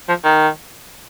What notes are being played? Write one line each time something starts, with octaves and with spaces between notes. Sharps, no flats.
F3
D#3